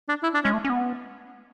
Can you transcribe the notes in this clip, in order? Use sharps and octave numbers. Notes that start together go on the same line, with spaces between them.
D4
E4
D4
G#3 C#4
A3
C#4
B3